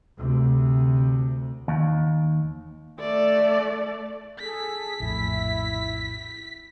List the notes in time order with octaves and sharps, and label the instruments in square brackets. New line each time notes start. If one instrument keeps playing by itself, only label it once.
[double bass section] D2 C3
[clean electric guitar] D#2
[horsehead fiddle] A3 D5
[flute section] G#4 A4 [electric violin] B6
[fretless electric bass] A#1 F2 A2 [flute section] E4